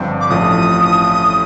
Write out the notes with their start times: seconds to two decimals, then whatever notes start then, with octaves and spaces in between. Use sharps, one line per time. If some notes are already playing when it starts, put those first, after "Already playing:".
Already playing: G1 G2 F3 C4
0.21 D6
0.29 A1 A2 F3 D#6